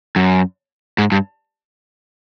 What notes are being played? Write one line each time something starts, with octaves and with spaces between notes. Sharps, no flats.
F#2
G#2
G2